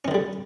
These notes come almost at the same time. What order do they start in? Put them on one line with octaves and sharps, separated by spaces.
C#4 D#3 D3 G3